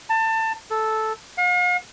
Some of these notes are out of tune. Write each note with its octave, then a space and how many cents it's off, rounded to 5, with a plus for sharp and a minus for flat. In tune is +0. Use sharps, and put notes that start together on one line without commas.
A5 +25
A4 -5
F5 +45